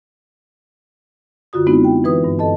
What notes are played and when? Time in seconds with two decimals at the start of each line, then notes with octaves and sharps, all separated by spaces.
1.53 F#2 D3 F4 F#4 D#6
1.67 G#3 B3 C4 D#4 E4 F#4
1.84 G5
2.04 E3 B4 D#6
2.24 G2
2.39 A4 D#5 A5